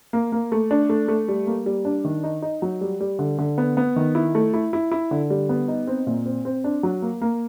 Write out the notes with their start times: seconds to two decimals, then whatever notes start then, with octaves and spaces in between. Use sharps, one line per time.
0.13 A#3
0.32 A#3
0.52 A3
0.71 D4
0.89 A3
1.08 A3
1.28 G3
1.47 A#3
1.66 G3
1.85 D4
2.05 D#3
2.24 D#4
2.42 D#4
2.62 F#3
2.81 G3
3.00 G3
3.19 D3
3.38 D3
3.58 B3
3.77 B3
3.96 D#3
4.15 E4
4.35 A3
4.54 E4
4.73 E4
4.92 E4
5.11 D3
5.30 G3
5.49 B3
5.68 D#4
5.87 C4
6.07 A#2
6.26 C4
6.45 C4
6.64 D4
6.83 F#3
7.02 A#3
7.21 A#3